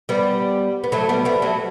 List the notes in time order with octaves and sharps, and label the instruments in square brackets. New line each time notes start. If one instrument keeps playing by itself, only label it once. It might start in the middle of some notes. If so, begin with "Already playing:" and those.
[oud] G3 B3
B3
F#3 A3
G3 B3
G3 B3
F#3 A3